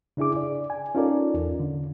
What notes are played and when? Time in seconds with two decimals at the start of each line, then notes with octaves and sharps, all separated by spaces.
0.17 C#3 D4 E4 G#4 D6
0.36 D5
0.70 G#5
0.95 C#4 D#4 F4 A4 A#4 D5
1.34 E2
1.60 D3